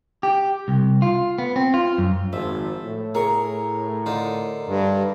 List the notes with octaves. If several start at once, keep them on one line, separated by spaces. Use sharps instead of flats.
G4
C2
F4
B3
C4
F4
F#2
G#1 F3 E5 A5
A2
G#4 A#4 C#5 C#6
D3 D#4 F4
G2